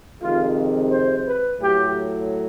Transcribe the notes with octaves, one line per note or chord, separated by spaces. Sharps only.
F2 C3 D#3 G#3 F4
C5
B4
A2 F#3 A3 G4